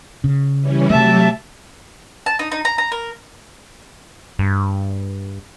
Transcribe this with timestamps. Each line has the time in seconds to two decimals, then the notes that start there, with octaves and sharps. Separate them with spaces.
0.24 C#3
0.61 E3 G3 C#4
0.90 C3 F#3 A3 G4 E5 A5
2.26 A5
2.39 D#4
2.52 D#4
2.65 A#5
2.78 A#5
2.92 A#4
4.39 G2